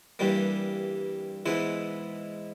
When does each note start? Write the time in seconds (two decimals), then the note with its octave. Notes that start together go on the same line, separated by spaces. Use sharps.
0.19 G2 E3 G3 A#3
1.46 G#2 E3 G#3 B3 E4